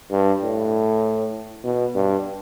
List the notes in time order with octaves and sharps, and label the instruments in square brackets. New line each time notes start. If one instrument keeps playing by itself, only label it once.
[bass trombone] G2
A2
B2
G2